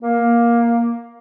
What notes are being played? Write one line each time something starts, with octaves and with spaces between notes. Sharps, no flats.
A#3